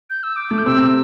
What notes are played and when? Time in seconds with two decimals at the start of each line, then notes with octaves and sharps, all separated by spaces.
0.10 G6
0.23 E6
0.36 D6
0.51 A3
0.58 G6
0.66 C3 C4 E6